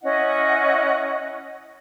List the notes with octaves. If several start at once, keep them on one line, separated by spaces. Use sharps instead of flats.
C#4 E4 D#5 F#5